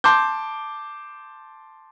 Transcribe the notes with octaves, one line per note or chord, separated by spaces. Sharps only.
A5 C6 D6 G6